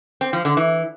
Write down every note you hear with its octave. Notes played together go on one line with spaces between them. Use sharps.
C4
F3
D3
E3